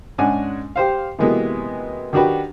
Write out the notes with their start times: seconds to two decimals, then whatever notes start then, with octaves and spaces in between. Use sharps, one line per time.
0.18 G#2 G#3 C#4 D4 F#5 G#5
0.76 G4 C5 F5
1.19 C3 E3 F#3 G#3 A#3 B3
2.13 D#3 D4 F#4 G4 B4